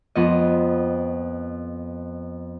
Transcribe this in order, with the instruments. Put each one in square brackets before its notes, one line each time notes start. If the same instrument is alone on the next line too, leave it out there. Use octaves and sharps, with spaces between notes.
[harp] F2 B3 D#5